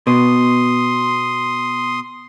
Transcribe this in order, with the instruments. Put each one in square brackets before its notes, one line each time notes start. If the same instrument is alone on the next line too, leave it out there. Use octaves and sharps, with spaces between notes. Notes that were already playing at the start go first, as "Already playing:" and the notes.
[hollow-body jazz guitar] B2 [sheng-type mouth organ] C6 D#6